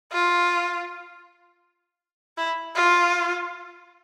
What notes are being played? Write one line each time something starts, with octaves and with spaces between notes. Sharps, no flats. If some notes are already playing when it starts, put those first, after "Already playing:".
F4
E4
F4